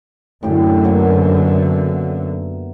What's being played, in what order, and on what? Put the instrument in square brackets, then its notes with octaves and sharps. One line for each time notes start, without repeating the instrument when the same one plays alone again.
[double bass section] F#2 D3 [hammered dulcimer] A2 G4
[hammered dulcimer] F#3 A#3 B3
E5